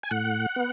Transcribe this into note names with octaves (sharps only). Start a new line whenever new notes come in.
G#5
A2 F#5
B3